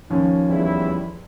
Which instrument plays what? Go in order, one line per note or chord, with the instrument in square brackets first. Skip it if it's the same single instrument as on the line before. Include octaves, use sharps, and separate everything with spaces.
[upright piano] D#2 F3 C#4
[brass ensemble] E2 G3 E4